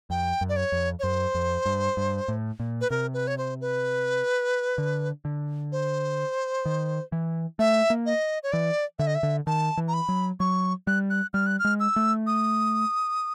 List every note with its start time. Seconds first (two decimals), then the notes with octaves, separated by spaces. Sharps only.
0.10 F2 G5
0.41 F#2
0.49 D5
0.56 C#5
0.72 F2
0.99 C#5
1.03 F#2 C5
1.35 F2
1.66 G2
1.97 G2
2.28 A2
2.60 A#2
2.81 B4
2.90 C3 A#4
3.14 B4
3.27 C#5
3.38 C5
3.61 B4
4.78 D3
5.25 D3
5.72 C5
6.65 D#3
7.12 E3
7.59 A3 E5
7.90 A#3
8.06 D#5
8.43 C#5
8.52 E3 D5
8.99 D3 E5
9.07 D#5
9.15 E5
9.23 D3
9.47 D#3 A5
9.77 E3
9.88 A#5
9.93 B5
10.09 F#3
10.40 F#3 C#6
10.87 G3 F#6
11.10 F#6
11.34 G3 F6
11.46 F#6
11.59 F6
11.65 G#3
11.80 E6
11.96 A3
12.27 D#6